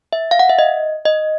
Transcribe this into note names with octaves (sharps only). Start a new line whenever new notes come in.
E5
F5
F#5
E5
D#5
D#5